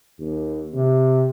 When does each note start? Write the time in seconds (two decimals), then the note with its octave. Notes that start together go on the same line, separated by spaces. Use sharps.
0.19 D#2
0.75 C3